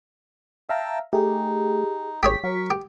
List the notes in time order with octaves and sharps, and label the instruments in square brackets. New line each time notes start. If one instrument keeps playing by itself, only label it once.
[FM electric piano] E5 F5 A#5 [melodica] G5 A5
[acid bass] A3 [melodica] D#4 [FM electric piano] G4 G#4
[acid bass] G#1 [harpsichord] G4 G#4 C#5 [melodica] G5 [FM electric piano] B6
[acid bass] F#3 [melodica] A#4 C#6
[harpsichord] G4